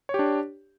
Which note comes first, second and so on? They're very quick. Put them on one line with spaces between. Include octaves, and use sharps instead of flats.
C#5 G4 D4